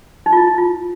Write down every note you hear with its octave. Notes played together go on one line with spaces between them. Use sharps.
D#4
F4
E4
E4
F4